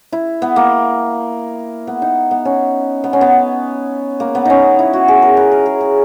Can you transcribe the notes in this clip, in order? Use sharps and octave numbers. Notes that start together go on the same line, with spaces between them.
E4
B3
A#3
B3
D#4
B3
C#4
B3
C#4
B3
A#3
B3
C#4 D#4
E4
F#4
G#4
A#4
B4
A#4
G#4
G#4